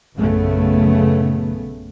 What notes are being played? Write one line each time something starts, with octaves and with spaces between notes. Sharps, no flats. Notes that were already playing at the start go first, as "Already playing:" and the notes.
A#1 F#2 C#3 A3 B3